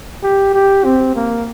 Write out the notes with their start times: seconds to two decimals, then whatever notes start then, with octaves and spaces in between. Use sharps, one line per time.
0.23 G4
0.54 G4
0.85 C4
1.15 A#3